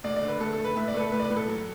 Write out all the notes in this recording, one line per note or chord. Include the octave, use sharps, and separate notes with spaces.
D2 D5
D5
D3
B4
A3 A4
A4
A3
B4
A2 E5
D5
A3 B4
A4
A2 B4
D5
B4
A2
A4
F#3